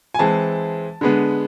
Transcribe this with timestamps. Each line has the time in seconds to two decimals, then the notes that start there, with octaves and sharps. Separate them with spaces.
0.14 G#5
0.19 E3 G#3 C4 A5
1.01 D3 G#3 B3